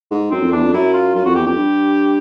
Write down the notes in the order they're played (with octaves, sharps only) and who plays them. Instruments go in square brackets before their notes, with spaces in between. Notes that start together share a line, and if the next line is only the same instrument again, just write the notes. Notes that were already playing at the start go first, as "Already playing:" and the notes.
[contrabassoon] G#2
[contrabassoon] F#2 [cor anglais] C4
[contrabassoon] F2
[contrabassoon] E2 [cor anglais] D4
[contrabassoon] F2
[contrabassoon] F#2 [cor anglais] E4
[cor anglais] F4
[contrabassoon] F#2 [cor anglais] F4
[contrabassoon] F2 [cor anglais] F#4
[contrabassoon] E2 [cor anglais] G4
[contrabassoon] F2 [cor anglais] G4
[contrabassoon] G2